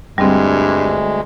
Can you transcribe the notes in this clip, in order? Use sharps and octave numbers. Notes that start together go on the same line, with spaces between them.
D2 G2 G3 G#3 C4